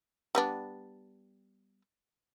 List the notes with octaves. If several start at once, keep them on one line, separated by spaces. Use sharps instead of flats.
G3 B3 D4